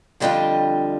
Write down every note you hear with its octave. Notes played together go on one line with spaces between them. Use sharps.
F2 D3 G3 D4 F4 D#5 G5